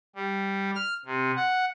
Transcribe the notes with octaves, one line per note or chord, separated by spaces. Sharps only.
G3
F6
C3
F#5